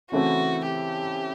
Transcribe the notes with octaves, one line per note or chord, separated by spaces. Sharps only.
C#3 E3 A3 C4 E4 F#4
G4